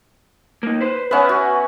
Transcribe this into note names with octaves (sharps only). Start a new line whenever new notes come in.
A#3 D#4
B4 C5
B3 C#4 B4 E5 F#5
F#4